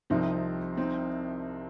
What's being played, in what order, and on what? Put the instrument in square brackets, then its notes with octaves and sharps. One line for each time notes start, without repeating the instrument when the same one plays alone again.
[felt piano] C2 C3 F3 [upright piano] C4 D#4
[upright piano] C4 D#4